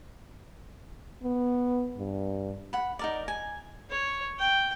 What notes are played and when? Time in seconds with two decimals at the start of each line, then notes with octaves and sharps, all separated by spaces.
1.24 B3
1.98 G2
2.73 F#5 B5
2.99 D#4 A#4 D5
3.28 G#5
3.90 C#5
4.39 G5